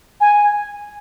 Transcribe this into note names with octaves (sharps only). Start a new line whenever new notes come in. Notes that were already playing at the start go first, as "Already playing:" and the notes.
G#5